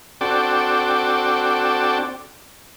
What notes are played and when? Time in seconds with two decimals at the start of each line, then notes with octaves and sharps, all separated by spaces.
0.21 C4 D4 F#4 A4 D5 G5